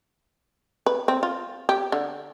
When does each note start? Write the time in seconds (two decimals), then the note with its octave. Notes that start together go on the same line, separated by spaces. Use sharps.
0.86 B4
1.08 C4
1.23 F4
1.69 G4
1.92 D3